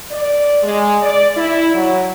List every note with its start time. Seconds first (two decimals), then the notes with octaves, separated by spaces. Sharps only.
0.12 D5
0.63 G#3
1.03 D5
1.36 E4
1.74 F#3